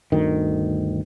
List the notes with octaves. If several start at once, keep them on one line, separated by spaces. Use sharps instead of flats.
G1 D2 D#3